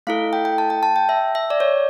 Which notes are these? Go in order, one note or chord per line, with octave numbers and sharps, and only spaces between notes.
A3 E4 A4 F5
G5
G5
A5
G5
A5
G5
E5
E5
D5
C#5